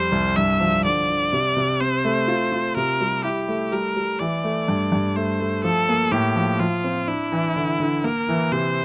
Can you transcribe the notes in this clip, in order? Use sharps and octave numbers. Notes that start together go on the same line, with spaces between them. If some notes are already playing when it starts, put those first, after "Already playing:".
Already playing: F2 G3 C5
C2
G2 E5
F3
D3 D5
D3
C3
C3
C4 C5
A3
F4
F4
C3 A#4
G3
E4 G4
A3
G3 A#4
G3
E3 D5
A3
G2
G2
A3 C5
A3
F3 A4
A#3
A2 G4
F3
F3 F4
C4
D4 E4
E3
D3
D3
A#3 A#4
E3
C3 C5